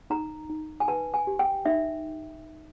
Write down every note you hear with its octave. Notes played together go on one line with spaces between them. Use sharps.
D#4 A#5
D#4
G#5
B4 A5
G#5
G4
G5
D#4 E5